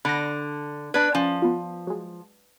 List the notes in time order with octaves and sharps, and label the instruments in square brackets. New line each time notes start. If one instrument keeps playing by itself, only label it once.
[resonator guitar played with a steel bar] D3 [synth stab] B5 A#6
[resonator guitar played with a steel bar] D4 B4 [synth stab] G#6
[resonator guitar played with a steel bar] F3 [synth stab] C#4
[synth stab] B3 F4
F#3 G#3